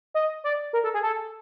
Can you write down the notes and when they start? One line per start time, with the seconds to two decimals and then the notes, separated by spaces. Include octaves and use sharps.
0.14 D#5
0.44 D5
0.73 A#4
0.84 A4
0.94 G#4
1.03 A4